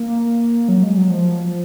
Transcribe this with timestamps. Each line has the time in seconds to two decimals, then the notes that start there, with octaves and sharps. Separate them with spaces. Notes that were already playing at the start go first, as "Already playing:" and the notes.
Already playing: A#3
0.68 F#3
0.83 G#3
0.97 F#3
1.10 F3